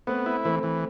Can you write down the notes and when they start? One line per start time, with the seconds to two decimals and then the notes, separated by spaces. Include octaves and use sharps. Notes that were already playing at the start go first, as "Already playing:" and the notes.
0.07 A3 B3 C4
0.26 E4
0.44 E3 A3 C4
0.63 E3